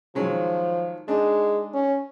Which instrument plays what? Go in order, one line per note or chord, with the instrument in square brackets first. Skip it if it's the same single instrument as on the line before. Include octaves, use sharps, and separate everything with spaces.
[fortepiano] D#3 F#3 G#3 [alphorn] F3
[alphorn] G#3 [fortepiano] D4 D#4
[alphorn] C#4